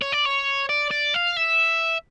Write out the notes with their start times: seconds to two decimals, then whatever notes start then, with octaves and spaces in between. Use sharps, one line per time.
0.02 C#5
0.13 D5
0.26 C#5
0.69 D5
0.91 D5
1.14 F5
1.37 E5